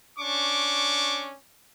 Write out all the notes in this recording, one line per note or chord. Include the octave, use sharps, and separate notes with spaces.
C#4 D4 C#6 D6